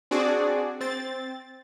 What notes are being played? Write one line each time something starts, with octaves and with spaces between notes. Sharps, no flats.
C4 D4 F#4 G#4 D5
C4 A6